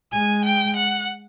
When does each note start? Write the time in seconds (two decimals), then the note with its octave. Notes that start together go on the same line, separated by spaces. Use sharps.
0.12 G#3 G#5
0.45 G5
0.76 F#5